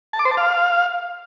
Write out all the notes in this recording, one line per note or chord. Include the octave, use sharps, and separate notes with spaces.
A5
D6
C5
A5
F5